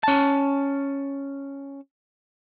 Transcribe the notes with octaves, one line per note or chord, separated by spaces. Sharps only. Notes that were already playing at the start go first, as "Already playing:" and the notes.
C#4 A5